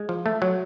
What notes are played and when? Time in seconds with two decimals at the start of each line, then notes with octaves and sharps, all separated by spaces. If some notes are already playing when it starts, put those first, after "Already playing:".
Already playing: G#3
0.09 F3
0.26 A3
0.42 F#3